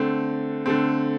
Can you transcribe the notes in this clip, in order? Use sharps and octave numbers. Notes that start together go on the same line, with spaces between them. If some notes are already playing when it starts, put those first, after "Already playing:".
Already playing: D3 A3 C4
D3 A3 C4